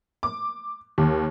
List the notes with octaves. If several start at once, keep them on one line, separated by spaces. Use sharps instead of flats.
D6
D#2